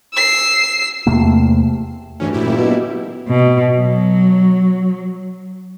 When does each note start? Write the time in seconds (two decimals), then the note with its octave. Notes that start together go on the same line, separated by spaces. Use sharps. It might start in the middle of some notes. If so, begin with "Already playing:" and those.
0.14 E6 C7
1.07 E2 C3 A3 A#3
2.20 D2 G2 E3 C#4
2.33 A#2 E4 G4
2.45 F#1
2.58 B2
3.29 B2
3.76 F#3